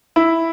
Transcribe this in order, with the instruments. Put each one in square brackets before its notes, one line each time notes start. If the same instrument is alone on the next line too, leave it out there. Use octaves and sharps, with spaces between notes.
[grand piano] E4